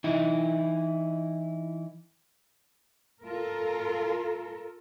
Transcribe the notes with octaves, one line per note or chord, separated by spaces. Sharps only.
E3 D#4 E4
F4 A4 A#4